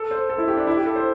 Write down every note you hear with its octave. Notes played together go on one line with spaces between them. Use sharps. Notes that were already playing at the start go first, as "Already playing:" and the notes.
Already playing: A4
C5
A4
E4
G4
D4
E4
G4
A4
C5